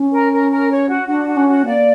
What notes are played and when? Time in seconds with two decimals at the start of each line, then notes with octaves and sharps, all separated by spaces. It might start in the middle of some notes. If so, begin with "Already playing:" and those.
Already playing: C#4
0.12 A#4
0.32 A#4
0.50 A#4
0.70 C#5
0.89 F#4
1.08 D4 F#4
1.28 F#4
1.37 C#4
1.47 F#4
1.65 A#3 D5